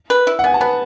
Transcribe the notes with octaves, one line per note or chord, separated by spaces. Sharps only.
B4
E4
F#5
B3 G#5
A5
B3 B4 B5